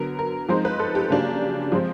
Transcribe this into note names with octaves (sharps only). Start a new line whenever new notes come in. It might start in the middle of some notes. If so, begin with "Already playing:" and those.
Already playing: D3 F#3 B3 A#4
A#4
F3 G#3 C4 D#4 C5
B4
A4
G4
C#3 F#3 A#3 D4
F3 G#3 C4